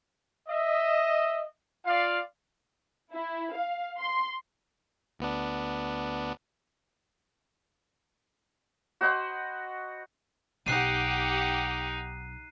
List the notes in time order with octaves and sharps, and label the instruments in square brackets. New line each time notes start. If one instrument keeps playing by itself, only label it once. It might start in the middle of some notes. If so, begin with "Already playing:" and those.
[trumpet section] D#5 E5
F4 D5 F5
[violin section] E4
F5
C6
[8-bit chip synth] D2 B3 D4
[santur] F#4 C5 D#5 B5
[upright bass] B1 [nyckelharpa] D#4 [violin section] G4 F#5 [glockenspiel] F#6 C7 D#7